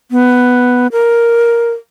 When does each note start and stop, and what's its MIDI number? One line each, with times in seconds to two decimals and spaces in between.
0.11 0.87 59
0.92 1.70 70